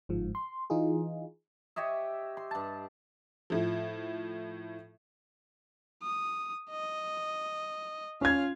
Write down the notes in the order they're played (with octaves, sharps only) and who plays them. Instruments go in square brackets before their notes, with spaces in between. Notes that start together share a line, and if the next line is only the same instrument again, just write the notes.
[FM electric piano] G1 G#2 F3
C6
E3 D#4 F4 G#4
[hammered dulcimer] G4 C#5 D#5 E5
C6
G2 A5
[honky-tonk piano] A2 F3
[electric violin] D#6
D#5
[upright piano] C#4 G#6 [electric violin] F4 F5